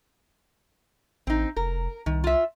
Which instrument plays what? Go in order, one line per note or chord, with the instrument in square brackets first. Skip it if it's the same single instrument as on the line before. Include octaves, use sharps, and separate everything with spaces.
[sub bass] A1 [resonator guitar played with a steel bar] C4 D#4
[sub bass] F1 [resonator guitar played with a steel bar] A#4
[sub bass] C2 [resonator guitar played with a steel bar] D#3
[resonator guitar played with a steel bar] F4 E5